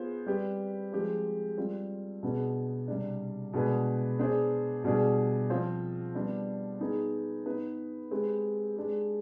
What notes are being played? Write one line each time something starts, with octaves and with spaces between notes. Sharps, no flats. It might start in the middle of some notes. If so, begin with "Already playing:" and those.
Already playing: B3 F4 G#4 C5
G3 C4 G4 B4
F3 G#3 C4 G4
G3 C4 F4
B2 B3 D4 G#4
C3 G3 D4
B2 G#3 D4 G#4 B4
B3 D4 G#4 C5
B2 G3 D4 G#4
F3 C4 F4 C5
G3 B3 D4
B3 D#4 G#4 B4
B3 D#4 B4
G#3 C4 G4 B4
G#3 D4 G4